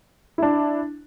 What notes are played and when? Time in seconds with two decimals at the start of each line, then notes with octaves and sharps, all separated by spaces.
0.38 D4 E4